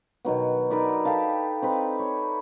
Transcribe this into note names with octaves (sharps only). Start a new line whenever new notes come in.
B2 D#3 F#3 B3
D#4 A#4 B4 D5
G4 A4 F5 A5
C4 D#4 B4
C#5